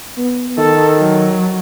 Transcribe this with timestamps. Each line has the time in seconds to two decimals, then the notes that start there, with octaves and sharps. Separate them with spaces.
0.18 B3
0.58 D#3 A4
1.00 F#3